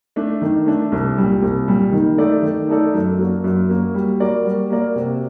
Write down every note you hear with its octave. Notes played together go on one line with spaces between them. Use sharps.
A3 D4
D#3
A3 D4
C2
A#2 G3
C2
A#2 G3
D#3
A3 D#4 A4 D5
D#3
A3 D#4 A4 D5
F#2
F#3 A#3 F#4
F#2
F#3 A#3 F#4
G3
A#3 F#4 A#4 D5
G3
A#3 F#4 A#4 D5
C3